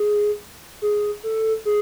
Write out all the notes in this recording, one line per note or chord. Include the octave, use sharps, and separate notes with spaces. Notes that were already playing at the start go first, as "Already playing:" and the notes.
Already playing: G#4
G#4
A4
G#4